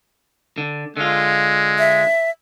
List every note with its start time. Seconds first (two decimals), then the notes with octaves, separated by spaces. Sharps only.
0.58 D3
0.97 D3 G#3 F4
1.78 E5